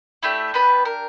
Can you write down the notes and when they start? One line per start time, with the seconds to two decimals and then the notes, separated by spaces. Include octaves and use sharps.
0.23 A3 D4 E4 G4 E5
0.54 B3 B4
0.85 A#4